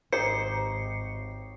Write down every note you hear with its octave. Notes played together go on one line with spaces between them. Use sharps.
G#1 D#4 G4 C5 C#5 C7 C#7